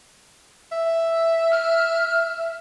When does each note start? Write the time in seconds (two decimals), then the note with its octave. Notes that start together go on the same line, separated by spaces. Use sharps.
0.72 E5
1.51 F6